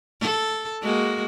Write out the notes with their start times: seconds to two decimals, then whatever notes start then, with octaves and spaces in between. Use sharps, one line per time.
0.20 A4
0.81 G#3 A#3 F#4